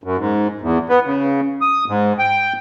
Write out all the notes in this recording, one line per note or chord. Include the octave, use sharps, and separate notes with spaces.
F#2
G#2
E2
B3
C#3
D#6
G#2
G5